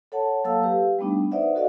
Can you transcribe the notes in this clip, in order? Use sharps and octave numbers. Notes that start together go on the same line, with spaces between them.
A4 C#5 F#5 A5
F#3 A#3 A4 F5 A5 E6
G4 B4 F5
G3 A3 B3 D4 D#4
D#4 B4 C5 D5 E5 F#5
F#4 A4 D5 D#5 F5